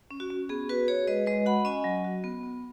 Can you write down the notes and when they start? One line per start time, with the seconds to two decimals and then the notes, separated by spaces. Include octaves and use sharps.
0.11 C#4
0.20 F#4
0.30 C#4
0.49 B3 G#4
0.69 F#4 B4
0.88 F#4 G#4 C#5
1.08 G#3 B4 D#5
1.27 G#3 B4 D#5
1.46 F#4 F#5 B5
1.65 C#4 D#5 G#5
1.84 F#3
2.04 F#4
2.24 B3
2.43 B3